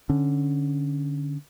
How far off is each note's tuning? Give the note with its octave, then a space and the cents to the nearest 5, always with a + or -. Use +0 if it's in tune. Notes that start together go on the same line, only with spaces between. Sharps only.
D3 +0 C#4 +0